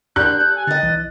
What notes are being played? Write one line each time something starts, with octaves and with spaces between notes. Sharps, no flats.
D3 D4 G4 A#4 F#6 G6
A4
G#5
D3 D#4 D#5 G5 A6
B1 E3